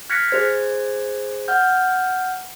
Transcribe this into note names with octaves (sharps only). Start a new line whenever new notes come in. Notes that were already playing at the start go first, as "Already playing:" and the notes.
F6 F#6 G#6 A#6 B6 C#7
G#4 C5 G#6
F#5 F6 G6